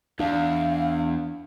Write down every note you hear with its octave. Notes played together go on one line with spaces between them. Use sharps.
E2 D4 F5